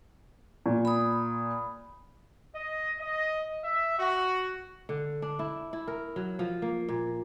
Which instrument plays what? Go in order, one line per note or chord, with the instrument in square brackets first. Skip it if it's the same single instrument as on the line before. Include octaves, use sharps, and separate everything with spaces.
[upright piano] A#2
[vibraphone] B5 D#6
[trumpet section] D#5
D#5
E5
F#4
[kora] D3
D4
E4
E4
A#4
F#3
F3
A#3
A#2